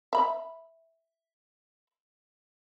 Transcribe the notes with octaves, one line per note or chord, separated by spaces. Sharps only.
E5 B5